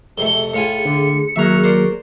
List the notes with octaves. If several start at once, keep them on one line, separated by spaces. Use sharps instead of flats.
F2 C3 A3 G#4 G7
A2 F4 G#5 C#7
D3
D#2 F#3 A#3 E5 A#5
A#4 C5 D5